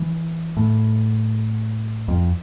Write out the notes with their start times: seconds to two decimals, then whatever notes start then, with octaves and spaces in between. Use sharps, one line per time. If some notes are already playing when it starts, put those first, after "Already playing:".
Already playing: E3
0.57 A2
2.08 F2